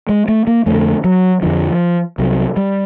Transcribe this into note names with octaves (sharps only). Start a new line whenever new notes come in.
G#3
A3
A#3
F2 D3 A3
F#3
F2 D3 F3
C2 C3 F#3
G3